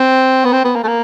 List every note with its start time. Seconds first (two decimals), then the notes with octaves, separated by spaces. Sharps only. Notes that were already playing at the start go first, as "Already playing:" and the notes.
Already playing: C4
0.45 B3
0.53 C4
0.64 B3
0.75 A#3
0.83 A3
0.88 A#3